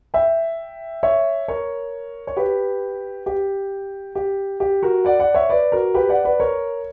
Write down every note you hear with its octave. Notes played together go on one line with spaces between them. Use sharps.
E5 G5
C#5 E5
A#4 C#5
C#5
G4 B4
G4
G4
G4
F#4 A#4
D5 F#5
D5 F#5
C#5 E5
B4 D5
F#4 A#4
G4 B4
D5 F#5
B4 D5
A#4 C#5